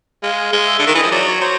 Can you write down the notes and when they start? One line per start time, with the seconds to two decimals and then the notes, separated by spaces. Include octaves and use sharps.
0.23 G#3 F5
0.53 G#3 F5
0.67 E5
0.79 D3
0.82 D#3 E5
0.95 E3 D#5
1.03 F3
1.11 F#3 D5
1.27 C#5
1.41 F#3 C5